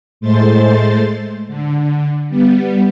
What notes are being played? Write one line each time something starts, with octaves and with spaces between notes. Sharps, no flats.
A2 G#3 A3 C5 C6 A6
D3
G3 B3